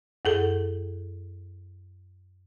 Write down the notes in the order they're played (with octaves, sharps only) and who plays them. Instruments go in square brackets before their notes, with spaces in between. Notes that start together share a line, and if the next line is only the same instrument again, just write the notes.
[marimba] F#2 G#4 A4